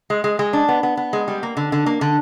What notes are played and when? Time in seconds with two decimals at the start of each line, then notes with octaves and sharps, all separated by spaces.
0.10 G#3
0.24 G#3
0.39 G#3
0.53 D4
0.69 B3
0.83 B3
0.97 B3
1.13 G#3
1.28 G3
1.43 A#3
1.57 D3
1.72 D3
1.86 A#3
2.01 D3